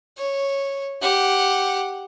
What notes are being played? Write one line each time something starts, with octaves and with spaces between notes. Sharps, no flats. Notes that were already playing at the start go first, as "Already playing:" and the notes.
C#5
G4 F#5